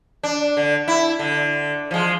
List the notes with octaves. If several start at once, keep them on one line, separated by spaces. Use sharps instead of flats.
D4
D3
E4
D3
F3 G#3